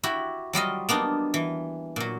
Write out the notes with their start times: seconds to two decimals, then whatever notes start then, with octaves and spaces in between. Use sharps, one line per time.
0.03 E4 F#4 G4
0.53 F#3 G3 F4 D#5
0.89 A#3 B3 D4 D#4
1.34 E3
1.96 A#2 F#3